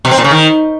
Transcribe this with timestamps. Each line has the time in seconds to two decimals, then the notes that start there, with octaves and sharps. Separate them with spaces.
0.05 B2
0.11 C4
0.18 A#2
0.24 C#3
0.31 D#3